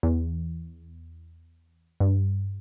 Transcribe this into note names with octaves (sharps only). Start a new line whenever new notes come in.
E2
G2